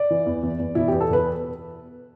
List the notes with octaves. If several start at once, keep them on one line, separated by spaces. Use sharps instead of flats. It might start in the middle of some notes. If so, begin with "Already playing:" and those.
Already playing: D5
E3
E2
E2
E2
B2 E4
E2 G4
A4
B2 B4